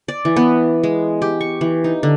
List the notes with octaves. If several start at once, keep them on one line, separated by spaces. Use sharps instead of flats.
D5
E3
B3
G#3
G4
C#6
E3
D#4
D3